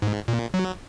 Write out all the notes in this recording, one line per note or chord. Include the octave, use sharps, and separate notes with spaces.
G#2
A#2
F#3